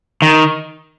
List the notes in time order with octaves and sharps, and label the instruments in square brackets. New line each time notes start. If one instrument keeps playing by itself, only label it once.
[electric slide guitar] D#3